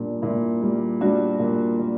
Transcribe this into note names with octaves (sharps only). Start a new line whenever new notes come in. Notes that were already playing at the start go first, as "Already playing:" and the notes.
Already playing: A#2 G3 D4
A#2 E4
G3
G3 D4 F#4
A#2
A#2